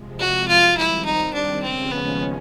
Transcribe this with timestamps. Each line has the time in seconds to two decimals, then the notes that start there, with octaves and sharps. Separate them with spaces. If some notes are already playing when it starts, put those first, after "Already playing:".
Already playing: C3 F3 G#3
0.19 F#4
0.48 F4
0.76 D#3 G3 C4 E4
1.05 D#4
1.34 D4
1.63 D#2 C#3 F3 G#3 C4 C#4
1.91 B3